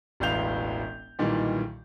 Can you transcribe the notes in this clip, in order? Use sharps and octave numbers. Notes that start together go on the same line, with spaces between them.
E1 A1 A2 F5 G6 F7
B1 A#2 D#3 E3 G3